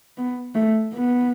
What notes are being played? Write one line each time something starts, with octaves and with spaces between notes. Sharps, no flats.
B3
A3
B3